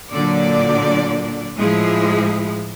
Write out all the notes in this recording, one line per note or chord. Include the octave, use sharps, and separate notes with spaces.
A#2 D3 F#3 D5
A2 F3 G#3 E4 G#4